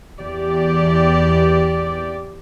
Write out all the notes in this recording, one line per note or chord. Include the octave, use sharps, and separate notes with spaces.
E2 G4 D5